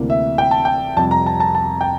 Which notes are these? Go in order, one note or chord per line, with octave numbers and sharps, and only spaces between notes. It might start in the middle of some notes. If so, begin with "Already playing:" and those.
Already playing: D2 C3 E3 A#3
E5
G5
A5
G5
F2 C3 G3 A5
A#5
A5
A5
A5
G5